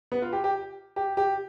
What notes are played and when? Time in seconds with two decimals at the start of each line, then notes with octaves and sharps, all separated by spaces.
0.12 B3
0.22 F4
0.33 G4
0.44 G4
0.96 G4
1.17 G4